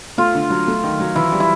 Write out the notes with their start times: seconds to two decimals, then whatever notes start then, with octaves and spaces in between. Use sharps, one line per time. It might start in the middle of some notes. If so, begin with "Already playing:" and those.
0.18 A3 F4
0.35 D3
0.50 F#3
0.67 A3
0.84 D#3
0.99 F#3
1.15 E3 E4
1.32 G3
1.40 E4